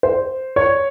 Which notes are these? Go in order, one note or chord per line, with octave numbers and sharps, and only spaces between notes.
C5
C#5